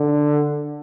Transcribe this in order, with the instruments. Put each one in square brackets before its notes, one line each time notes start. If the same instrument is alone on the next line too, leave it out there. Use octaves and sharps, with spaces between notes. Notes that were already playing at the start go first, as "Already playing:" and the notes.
Already playing: [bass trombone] D3